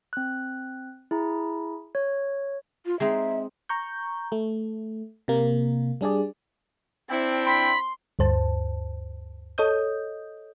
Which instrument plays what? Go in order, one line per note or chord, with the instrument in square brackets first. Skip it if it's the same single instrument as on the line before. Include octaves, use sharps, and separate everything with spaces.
[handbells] C4 F#6
E4 G#4 A#5
C#5
[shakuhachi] F4
[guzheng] G#3 C4 D#4 [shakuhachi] E5
[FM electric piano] A#5 C#6 G6
A3
C3 A#3
G3 D4 G#4 D5
[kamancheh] C4 [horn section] D4 E4 G5
[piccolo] B5 [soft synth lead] C6
[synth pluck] D2 G2 C5 A5
A4 C#5 D#5 D#6 G6